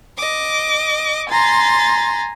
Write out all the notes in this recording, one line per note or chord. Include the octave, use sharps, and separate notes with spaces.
D#5 D6
G#5 A#5 C6 A6